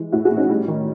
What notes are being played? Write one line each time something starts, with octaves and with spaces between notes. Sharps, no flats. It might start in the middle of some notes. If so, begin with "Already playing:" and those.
Already playing: E3 G#3
A2 E4 F#4
F#4 G#4
A2
C#4 D#4
G3
D#3